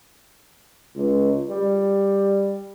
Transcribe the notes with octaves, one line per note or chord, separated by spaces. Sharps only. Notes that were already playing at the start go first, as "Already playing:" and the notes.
C#2
G3